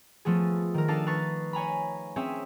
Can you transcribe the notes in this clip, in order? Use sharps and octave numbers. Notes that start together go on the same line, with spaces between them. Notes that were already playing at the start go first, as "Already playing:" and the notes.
F3 A3 B3 G#4
D#3 A#4
D4 D#4 A4 F5 A5
B4 F5 A#5 C#6 A6
C#5 G#5 A#5 B5
C4 C#4 G#4 E5